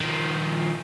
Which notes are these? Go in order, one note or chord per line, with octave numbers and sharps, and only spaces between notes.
D#3 F3